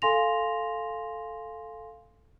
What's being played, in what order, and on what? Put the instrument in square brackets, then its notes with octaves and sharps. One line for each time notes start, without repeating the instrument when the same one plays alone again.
[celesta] A4 F5 G#5 C6 A#6 F7